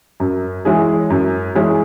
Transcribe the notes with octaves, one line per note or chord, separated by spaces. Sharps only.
F#2
E3 G#3 C#4 G#4
F#2
E3 G#3 C#4 G#4